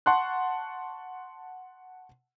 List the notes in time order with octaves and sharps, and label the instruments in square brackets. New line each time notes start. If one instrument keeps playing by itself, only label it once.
[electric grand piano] F#5 A5 C6 C#6 F#6